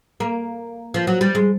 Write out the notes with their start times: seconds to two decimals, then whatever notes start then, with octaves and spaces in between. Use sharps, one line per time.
0.20 A#3
0.94 F3
1.07 F#3
1.21 G3
1.35 G#3